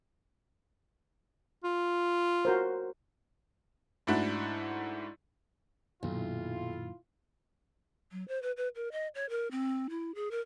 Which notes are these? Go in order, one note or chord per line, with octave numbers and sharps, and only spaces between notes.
F4
F#4 A#4 C5
G#2 A3 D4 E4 F#4
B1 F#2 A#2 D#3 E4 F4
F#3
C5
B4
B4
A#4
D#5
C#5
A#4
C4
E4
G#4
A#4